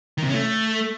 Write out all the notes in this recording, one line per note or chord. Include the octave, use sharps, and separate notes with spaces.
D#3
C3
C#4
A3